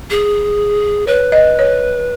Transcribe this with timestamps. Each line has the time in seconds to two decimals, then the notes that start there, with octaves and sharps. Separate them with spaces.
0.10 G#4
1.07 B4 C#5
1.32 D#5
1.59 C#5